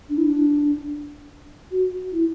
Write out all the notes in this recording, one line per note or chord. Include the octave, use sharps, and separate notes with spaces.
D4
E4
D4
F#4
E4